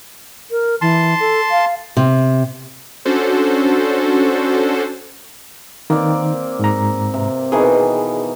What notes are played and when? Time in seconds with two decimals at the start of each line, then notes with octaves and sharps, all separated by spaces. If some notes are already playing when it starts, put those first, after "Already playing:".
0.51 A#4
0.81 E3 A5 C6
1.20 A4
1.51 F5
1.97 C3
3.05 C#4 D4 F#4 A4 C5
5.90 D#3 A#3 C4 D5
6.59 G#2 A#5
7.14 C3
7.52 B2 D#3 E3 G#4